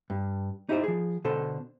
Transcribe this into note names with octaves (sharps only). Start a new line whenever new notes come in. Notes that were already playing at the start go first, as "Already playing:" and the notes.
G2
D#4 E4 G4 A4 C5
F3 G#4
B2 D3 A4 C5